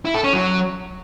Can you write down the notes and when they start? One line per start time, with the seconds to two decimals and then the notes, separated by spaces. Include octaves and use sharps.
0.05 E4
0.15 A4
0.24 C#4
0.33 F#3